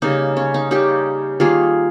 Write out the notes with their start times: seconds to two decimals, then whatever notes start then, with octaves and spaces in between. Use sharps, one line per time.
0.02 C#3 G3 A#3 D#4
0.37 C#4
0.54 D#4
0.71 C#3 G3 A#3 D#4 G4
1.40 D#3 G3 A#3 F4 G#4